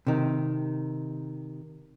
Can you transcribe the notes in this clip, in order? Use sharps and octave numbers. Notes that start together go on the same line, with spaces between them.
C3 D#3